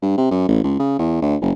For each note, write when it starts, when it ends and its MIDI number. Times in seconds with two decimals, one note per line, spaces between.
0.02 0.17 43
0.17 0.30 48
0.31 0.43 42
0.48 0.59 33
0.64 0.78 37
0.79 0.97 49
0.99 1.21 40
1.22 1.36 38
1.41 1.52 30